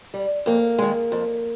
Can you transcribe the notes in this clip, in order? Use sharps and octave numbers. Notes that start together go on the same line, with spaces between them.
G3
F2 A#3
D#3 G#3
F2